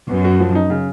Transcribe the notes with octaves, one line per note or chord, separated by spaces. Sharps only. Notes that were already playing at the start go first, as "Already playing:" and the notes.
F#2 B3
F#4
F3
D#4
C#3